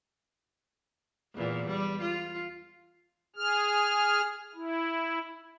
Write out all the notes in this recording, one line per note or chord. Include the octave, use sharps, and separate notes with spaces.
E2 A#2
G3
F4
G#4 F6
E4